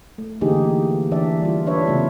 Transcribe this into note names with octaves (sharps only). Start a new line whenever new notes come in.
A3
D3 E3 A#3 D#4 G4 G#4
E3 D4 D5 E5
G3 F4
D4 E4 B4 C#5 E5
C#3 A3 B3 F4